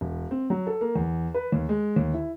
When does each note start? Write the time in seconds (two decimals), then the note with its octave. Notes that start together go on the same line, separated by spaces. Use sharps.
0.01 E1
0.31 C4
0.50 F#3
0.67 A4
0.81 A#3
0.95 E2
1.34 B4
1.52 D#2
1.69 G#3
1.96 D#2
2.14 E4